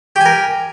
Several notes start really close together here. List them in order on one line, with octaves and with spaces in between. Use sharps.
G4 G#5 A#4